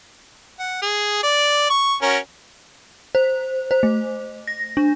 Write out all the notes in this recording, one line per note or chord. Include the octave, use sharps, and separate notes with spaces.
F#5
G#4
D5
C#6
C#4 F#4 A#4
C5
C5
A3
A#6
D4